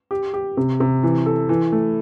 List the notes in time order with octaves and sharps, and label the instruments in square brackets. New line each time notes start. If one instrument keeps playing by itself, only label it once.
[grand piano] G4
G4
C3
C3
E3
A4
E3
A3